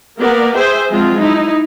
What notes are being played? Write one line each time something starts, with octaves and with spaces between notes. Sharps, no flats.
A#3 B3 A#4 D5
G#4 C5 E5 G5
F3 F#3 G#3 C4 F4
D#4 E4